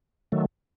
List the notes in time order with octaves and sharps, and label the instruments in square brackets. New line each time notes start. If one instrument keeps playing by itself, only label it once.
[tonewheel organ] D#3 F#3 A3